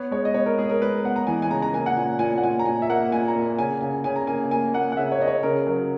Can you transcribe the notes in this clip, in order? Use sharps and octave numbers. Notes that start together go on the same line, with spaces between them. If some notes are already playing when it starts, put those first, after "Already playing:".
Already playing: B3 C#5
G#3 C#5
D#5
B3 C#5
A#4
G#3 G#4
A#4
G#3 B4
B3 F#5
A#5
E3 G#5
G#5
C#3 A#5
A#5
A#3 G#5
F#5
A#2 G#5
A#2 G#5
F#5
A#2 G#5
A#5
A#2 G#5
E5
A#3 F#5
A#2 G#5
A#5
A#3
C#3 G#5
C#3 G#5
C#3 G#5
A#5
A#3 G#5
A#3 G#5
A#3 F#5
F#5
C#3 E5
C#5
C#3 D#5
C#5
C#3 A#4
F#3 A#4